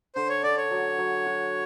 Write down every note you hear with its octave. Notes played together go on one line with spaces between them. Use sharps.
D3 C5
C#5
D3 D5
C#5
F#3
F#3
F#4